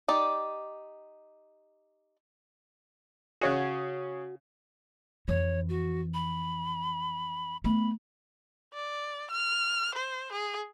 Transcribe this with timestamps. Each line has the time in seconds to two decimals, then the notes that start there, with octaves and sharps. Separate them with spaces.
0.08 D#4 G4 D5
3.41 C#3 C#4 F#4 G#4
5.28 F2 E3 C#5
5.69 F#4
6.14 B5
7.64 A3 B3 B5
8.74 D5
9.31 F6
9.95 C5
10.32 G#4